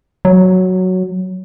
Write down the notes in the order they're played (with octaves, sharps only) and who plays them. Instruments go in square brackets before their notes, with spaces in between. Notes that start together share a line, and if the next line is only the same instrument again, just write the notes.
[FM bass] F#3